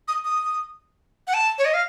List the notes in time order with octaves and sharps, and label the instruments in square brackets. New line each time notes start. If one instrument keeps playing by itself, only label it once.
[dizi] D#6
D#6
F#5
A5
C#5
D#5
F5